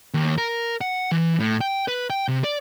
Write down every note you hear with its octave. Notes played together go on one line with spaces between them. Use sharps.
D#2
A#4
F#5
E3
A2
G5
B4
G5
C3
D5